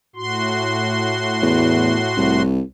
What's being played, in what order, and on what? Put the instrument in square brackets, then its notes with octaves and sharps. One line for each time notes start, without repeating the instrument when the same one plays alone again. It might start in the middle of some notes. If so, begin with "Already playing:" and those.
[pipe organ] A2 F#4 C6
[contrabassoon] E2
C2